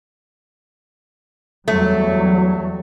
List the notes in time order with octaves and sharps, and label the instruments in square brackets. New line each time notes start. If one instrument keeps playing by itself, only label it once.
[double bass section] E2 F#3 G3 [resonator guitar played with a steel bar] A3